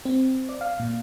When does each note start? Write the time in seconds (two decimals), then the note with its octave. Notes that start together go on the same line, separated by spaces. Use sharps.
0.05 C4
0.49 D5
0.61 F5
0.80 A#2